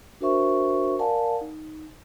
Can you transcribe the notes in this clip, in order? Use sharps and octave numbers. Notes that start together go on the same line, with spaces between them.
D4 F#4 A#4 C5 E5 C#6
A#4 D5 F5 F#5 G#5 A5
D#4